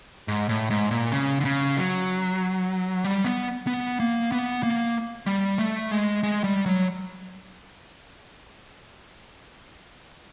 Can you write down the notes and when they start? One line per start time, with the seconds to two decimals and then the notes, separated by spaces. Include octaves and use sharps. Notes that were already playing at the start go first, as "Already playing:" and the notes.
0.28 G#2
0.49 A2
0.70 G#2
0.91 A#2
1.12 C#3
1.40 D3
1.45 C#3
1.77 F#3
3.04 G3
3.25 B3
3.67 B3
4.00 A#3
4.32 B3
4.63 A#3
5.26 G3
5.58 A3
5.91 G#3
6.23 G#3
6.44 G3
6.66 F#3